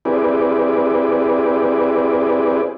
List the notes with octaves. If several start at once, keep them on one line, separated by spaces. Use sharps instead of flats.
C4 E4 G4 G#4 B4 D5